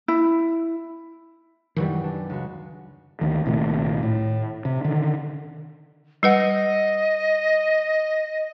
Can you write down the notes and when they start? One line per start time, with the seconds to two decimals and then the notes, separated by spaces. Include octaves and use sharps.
0.08 E4
1.76 B1 F#2 D#3 E3 F#3 G3
2.04 D4
2.30 C#2 F#4
3.21 D2 D#3
3.46 C2 A#2 D#3 A3
4.03 A2
4.65 C3
4.85 D3 D#3
6.23 G3 B4 D#5 F#5